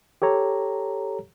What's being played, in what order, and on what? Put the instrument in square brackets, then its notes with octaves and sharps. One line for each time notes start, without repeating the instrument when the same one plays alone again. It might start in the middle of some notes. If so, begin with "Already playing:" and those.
[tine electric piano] G4 A4 C#5 A#5